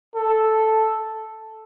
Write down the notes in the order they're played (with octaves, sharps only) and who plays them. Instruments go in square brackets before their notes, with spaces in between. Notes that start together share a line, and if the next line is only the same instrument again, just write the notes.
[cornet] A4